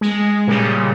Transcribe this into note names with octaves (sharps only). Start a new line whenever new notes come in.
G#3
A#2 C#3 G3